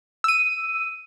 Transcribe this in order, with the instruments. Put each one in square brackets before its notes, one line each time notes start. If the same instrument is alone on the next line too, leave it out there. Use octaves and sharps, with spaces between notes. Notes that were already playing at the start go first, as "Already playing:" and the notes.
[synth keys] E6 D#7